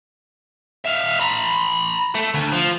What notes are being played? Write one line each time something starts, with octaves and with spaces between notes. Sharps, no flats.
E5 F5
A#5 B5
A3 A4
D2
F3